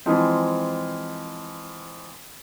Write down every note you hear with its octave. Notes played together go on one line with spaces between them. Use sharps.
E3 F3 G#3 C4